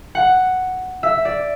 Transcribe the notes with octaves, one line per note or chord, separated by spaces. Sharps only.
F#5
E5
D5